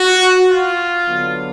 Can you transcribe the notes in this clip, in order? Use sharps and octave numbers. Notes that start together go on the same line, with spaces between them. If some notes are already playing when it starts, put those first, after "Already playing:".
Already playing: F#4
F4
D3 F#3 B3